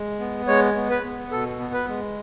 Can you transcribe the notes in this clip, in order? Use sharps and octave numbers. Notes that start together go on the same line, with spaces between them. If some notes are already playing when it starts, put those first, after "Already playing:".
Already playing: G#3
B3
G#3 C#5
B3
B4
B3
B2 A4
B3
B4
G#3